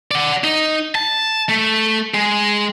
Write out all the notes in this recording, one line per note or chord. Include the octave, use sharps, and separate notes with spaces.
D5 F#5
D#4
A5
A3
G#3